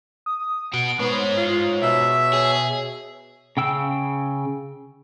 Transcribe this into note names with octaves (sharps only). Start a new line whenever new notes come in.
D#6
B2 F#4 D7
G#3 B3 C5 C#5
F4
B2 E5
G#4
C#3 G5 E6